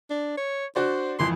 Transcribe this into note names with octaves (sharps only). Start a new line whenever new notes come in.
D4
C#5
D4 F#4 C5 D5
G#1 F2 E3 C6